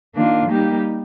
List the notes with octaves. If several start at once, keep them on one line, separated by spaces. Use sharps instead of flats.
D#3 A#3 D4 F4
G3 A#3 D#4 G4